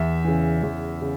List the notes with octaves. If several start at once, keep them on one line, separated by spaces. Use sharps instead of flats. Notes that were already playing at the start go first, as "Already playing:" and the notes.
Already playing: E2 E5
C#3 E3
E2
C#3